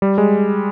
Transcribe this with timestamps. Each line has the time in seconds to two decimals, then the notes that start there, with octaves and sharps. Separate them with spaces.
0.02 G3
0.18 G#3